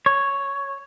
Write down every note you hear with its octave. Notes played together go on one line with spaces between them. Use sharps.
C#5